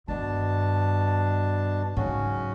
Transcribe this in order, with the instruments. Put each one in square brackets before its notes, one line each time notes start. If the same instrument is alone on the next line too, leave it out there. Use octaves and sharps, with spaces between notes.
[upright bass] G2 D#3 [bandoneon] B2 D4 A5
[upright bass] G#2 F#3 [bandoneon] C#3 C#4 F#4